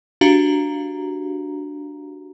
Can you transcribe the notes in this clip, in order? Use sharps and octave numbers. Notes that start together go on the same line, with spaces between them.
D4 F#4 G4 F5 A#5